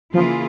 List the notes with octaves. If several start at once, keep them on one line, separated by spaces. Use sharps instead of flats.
C#3 E3 F3 A#3 F4 G#4